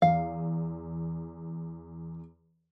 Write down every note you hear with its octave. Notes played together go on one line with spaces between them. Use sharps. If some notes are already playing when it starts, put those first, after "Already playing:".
E2 F5